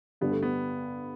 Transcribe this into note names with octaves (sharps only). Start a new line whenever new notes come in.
G2 D3 G3 B3 D4
A3
B3